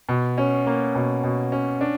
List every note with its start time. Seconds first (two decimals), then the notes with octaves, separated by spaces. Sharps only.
0.09 B2
0.38 C#4
0.66 A#3
0.95 B2
1.24 B2
1.52 C#4
1.81 D4